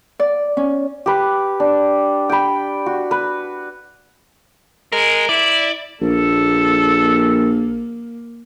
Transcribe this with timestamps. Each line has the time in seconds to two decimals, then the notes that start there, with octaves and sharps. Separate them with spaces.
0.20 D5
0.57 C#4
1.06 G4 B4
1.60 D4
2.30 G5 B5
2.86 F#4
3.11 B4
4.92 G#3 A#4
5.29 E4 D5
6.01 A#1 A#3 A4